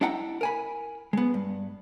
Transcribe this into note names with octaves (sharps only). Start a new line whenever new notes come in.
D4 E4 D#5 F#5 G5 A#5
A#4 G#5 B5
G#3 B3
G2